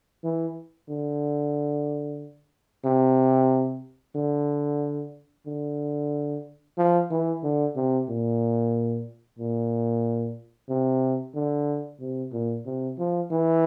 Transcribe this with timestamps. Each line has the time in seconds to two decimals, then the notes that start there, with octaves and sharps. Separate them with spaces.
0.24 E3
0.89 D3
2.85 C3
4.16 D3
5.46 D3
6.78 F3
7.10 E3
7.43 D3
7.76 C3
8.08 A#2
9.39 A#2
10.69 C3
11.35 D3
12.00 C3
12.33 A#2
12.66 C3
12.98 F3
13.32 E3